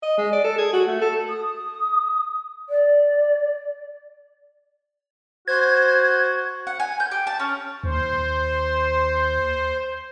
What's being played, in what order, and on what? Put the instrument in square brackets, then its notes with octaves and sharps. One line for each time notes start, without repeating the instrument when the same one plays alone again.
[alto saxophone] D#5
G#3
D5
A4
G#4
F#4
A3
A4
[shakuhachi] D#6
D5
[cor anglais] F#4 [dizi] C5 [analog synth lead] G#6
[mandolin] F#5
G#5
G6
G4
A5
C#4
[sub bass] D#2 [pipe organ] C5